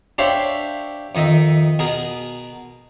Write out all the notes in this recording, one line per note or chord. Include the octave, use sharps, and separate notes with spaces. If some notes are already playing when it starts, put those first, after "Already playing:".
D4 G4 C5 C#5 E5 F5
F2 D#3 D#5 E5
B2 G#4 A#4